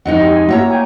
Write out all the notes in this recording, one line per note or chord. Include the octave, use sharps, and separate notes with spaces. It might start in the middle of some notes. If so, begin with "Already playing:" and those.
F2 G#3 D#4 F#5
G4 D#5
G#5
A#3 E4 F#4 C#5 E5 A#5
G5 G#5